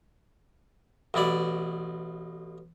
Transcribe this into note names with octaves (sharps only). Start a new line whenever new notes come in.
A1 B2 E4 D5